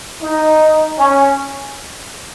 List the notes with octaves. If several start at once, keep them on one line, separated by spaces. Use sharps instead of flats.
D#4
C#4